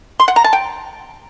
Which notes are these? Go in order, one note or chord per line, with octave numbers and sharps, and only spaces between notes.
C6
F#5
A#5
A5
G5